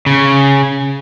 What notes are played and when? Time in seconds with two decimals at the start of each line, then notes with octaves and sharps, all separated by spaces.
0.06 C#3